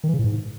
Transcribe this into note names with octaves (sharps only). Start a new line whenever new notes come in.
D#3
E3
C#3
A2
G#2